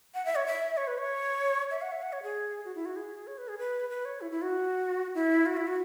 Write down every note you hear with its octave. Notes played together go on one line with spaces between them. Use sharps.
F#5
E5
C#5
E5
C#5
B4
C#5
E5
F#5
E5
F#5
C#5
G#4
F#4
E4
F#4
G#4
C#5
B4
G#4
B4
B4
C#5
E4
E4
F#4
E4
F#4
E4
F#4